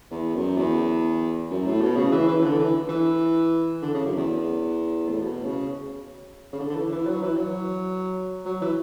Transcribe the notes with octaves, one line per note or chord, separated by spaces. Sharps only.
E2
F#2
E2
F#2
A2
B2
C#3
E3
E3
D3
E3
E3
D3
C#3
F#2
E2
A2
B2
C#3
C#3
D3
D3
E3
E3
F#3
E3
F#3
F#3
E3